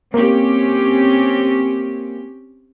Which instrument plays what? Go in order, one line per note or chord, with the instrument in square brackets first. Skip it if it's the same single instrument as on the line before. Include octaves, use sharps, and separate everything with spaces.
[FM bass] A#3 [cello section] C4 C#4 G4